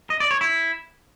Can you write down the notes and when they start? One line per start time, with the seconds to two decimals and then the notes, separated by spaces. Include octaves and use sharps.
0.10 D#5
0.20 D5
0.31 C#5
0.41 E4